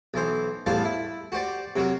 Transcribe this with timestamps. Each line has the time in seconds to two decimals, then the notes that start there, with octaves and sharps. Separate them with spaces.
0.14 B1 E3 C5
0.66 A1 E2 G3 C5 F5 A5
0.85 E4
1.32 F#4 G4 C5 D5
1.76 C3 F#3 F#4 A#4